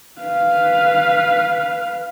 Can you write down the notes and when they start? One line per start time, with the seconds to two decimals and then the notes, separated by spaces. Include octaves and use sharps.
0.21 B4 F5